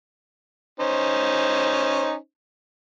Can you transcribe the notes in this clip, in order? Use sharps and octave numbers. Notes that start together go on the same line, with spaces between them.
C#4 D#4 C5